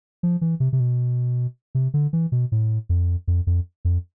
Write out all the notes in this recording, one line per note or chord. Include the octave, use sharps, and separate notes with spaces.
F3
E3
C3
C3
B2
C3
D3
E3
B2
A2
F2
F2
F2
F2